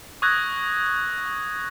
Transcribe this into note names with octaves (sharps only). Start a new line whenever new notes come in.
C#6 D#6 E6 F#6 G#6 A#6